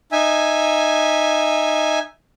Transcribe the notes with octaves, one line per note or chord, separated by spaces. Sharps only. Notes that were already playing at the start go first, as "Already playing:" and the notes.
D#4 E5 G#5